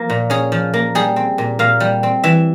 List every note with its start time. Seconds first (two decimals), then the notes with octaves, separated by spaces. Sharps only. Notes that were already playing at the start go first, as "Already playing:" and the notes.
Already playing: F3 A#3
0.10 A#2
0.30 C#4 G#4
0.52 F3
0.74 A#3
0.95 G3 G#4
1.16 C4
1.38 A#2
1.59 A#2 F5
1.80 G3
2.03 C4
2.24 E3 E5